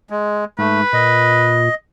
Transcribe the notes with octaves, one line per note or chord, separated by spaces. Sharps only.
G#3
G#2 A3 B4
A#2 D#5